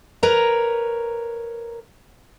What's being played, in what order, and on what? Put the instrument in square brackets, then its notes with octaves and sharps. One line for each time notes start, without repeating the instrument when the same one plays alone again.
[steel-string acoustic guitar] A#4 B4 C#5 A#5